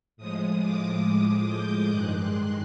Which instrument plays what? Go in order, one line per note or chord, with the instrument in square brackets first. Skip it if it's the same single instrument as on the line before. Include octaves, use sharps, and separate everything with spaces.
[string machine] A2 F3 G#3 D#6
D6
D#6
G6
G2 D#3 G#3 F#6
C6